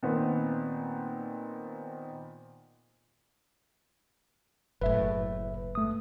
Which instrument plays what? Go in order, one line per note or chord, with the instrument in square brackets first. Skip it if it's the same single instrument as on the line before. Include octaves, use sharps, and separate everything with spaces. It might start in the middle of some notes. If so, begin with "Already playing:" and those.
[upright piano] A#2 D#3 B3 C4
[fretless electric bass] F#1 A2 [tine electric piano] B4 E5
[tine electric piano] A3 D#6